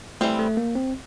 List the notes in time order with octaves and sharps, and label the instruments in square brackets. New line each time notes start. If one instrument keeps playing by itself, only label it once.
[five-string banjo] E3 G3 C4 [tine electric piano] A3
[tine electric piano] A3
A#3
C4